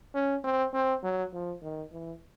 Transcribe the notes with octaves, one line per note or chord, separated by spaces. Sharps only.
C#4
C4
C4
F#3
F3
D#3
E3